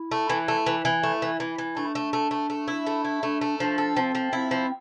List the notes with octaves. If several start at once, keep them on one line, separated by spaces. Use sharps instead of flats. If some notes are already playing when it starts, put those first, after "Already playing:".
Already playing: E4
A3
E3 E4
A3
E3
E3
A3
E3
E3
E3
A3 D4
A3
A3
A3
A3
E4
A3
E4
A3 D4
A3
F3 D4
A4
F3 C4
F3
C4 E4
F3